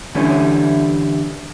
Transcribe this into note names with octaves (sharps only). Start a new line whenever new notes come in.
D3 E3 G3 A3 C#4 E4